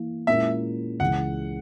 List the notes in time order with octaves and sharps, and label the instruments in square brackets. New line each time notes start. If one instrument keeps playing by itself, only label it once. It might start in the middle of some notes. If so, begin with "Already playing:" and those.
Already playing: [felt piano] E3 A#3 E4
[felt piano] A#2 G#3 C#4 E4 A#4 [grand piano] E5
[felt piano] C#2 C#3 E3 [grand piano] F#5